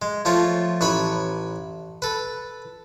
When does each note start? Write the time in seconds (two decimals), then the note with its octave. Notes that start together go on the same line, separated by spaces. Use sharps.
0.02 G#3
0.25 F3 A3 F4 C#5
0.81 A1 B4 C#5 B5
2.02 A4 B4